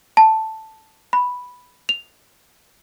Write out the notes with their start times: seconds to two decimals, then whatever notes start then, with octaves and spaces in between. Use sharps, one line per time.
0.17 A5
1.13 B5
1.89 F7